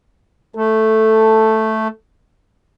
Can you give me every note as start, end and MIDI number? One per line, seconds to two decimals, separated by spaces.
0.56 1.88 57
0.56 1.94 69